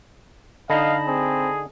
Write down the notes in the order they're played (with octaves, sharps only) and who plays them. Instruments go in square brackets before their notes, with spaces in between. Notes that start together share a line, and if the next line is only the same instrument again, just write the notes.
[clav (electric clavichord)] D3 D#4 [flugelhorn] D#5 [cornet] F5 [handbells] A5 B5 A#6
[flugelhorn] C4 [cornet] G#4